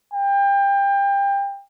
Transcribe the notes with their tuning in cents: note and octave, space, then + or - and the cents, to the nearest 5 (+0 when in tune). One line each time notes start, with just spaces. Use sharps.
G5 +25